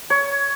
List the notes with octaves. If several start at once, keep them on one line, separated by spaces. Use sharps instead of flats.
C#5